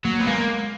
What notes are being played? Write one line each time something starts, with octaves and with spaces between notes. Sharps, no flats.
F#3 A#3
B3
G#3 A#3